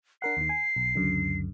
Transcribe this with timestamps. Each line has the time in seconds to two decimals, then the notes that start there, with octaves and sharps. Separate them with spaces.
0.22 D4 A#4 F#5 C7
0.37 D#2 D#3
0.49 G#5
0.76 B1
0.95 C#2 F#2 D3